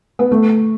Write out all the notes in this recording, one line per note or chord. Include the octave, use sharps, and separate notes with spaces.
B3
A3